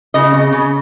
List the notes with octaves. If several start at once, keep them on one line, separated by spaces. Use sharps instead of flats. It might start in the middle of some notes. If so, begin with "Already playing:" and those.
C#3 D#5
C#3
C#3